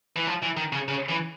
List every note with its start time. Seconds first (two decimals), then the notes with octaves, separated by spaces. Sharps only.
0.16 E3
0.27 F3
0.43 E3
0.57 D#3
0.73 C#3
0.88 C#3
1.09 E3